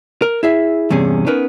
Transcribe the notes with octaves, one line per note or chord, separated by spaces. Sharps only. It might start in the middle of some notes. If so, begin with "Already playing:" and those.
A#4
E4 G#4 E5
E2 G2 C3 C#4 G#4
B3 C#4 D#4 A#4 B4